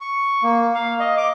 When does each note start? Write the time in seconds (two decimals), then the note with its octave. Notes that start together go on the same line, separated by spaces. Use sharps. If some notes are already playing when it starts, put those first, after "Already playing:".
0.01 C#6
0.43 A#3
0.75 F5
1.00 D#5
1.17 D6